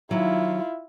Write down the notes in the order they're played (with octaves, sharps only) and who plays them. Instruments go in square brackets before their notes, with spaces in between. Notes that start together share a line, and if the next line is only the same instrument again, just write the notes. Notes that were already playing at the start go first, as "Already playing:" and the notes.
[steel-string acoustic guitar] D#3 F#3 [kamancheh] E4 F4